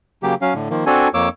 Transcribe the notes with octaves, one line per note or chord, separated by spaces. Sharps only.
C#3 F#3 A#3 G4
F#3 C#4 F5
A2 D3
D#3 F3 A#3
C4 D4 F#4 A4 G#5
F2 A#3 C#5 D6 E6